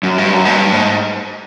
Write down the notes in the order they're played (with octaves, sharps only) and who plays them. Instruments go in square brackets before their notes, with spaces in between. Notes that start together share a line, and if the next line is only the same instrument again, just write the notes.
[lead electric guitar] F#2
G2
F#2
G#2
G2
G#2